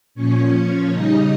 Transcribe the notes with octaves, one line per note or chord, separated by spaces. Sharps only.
A#2 F3 C#4 C#5
C#3 G3 D#4 D#5